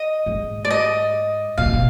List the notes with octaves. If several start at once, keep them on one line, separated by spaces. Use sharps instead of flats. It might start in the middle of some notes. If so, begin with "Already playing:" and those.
Already playing: D#5
G#2
D5
D#5
B2 F5
C3
B2